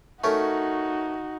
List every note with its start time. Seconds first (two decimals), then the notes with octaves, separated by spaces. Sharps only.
0.24 A3 C#4 D#4 F#4 A#4